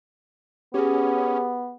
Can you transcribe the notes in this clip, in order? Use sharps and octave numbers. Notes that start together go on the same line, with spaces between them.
B3 C#4 G4 G#4